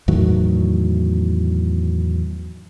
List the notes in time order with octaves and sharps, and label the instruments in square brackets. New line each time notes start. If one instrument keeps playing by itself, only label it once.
[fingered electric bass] E2 A2 D#3 F#3